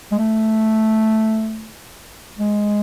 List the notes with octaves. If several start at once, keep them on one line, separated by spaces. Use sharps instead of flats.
G#3
A3
G#3